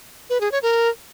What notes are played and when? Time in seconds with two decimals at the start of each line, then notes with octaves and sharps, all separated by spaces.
0.30 B4
0.41 G#4
0.52 C#5
0.63 A#4